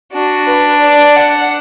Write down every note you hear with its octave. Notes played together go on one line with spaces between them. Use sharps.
D4 F#4
B4
D5
F#5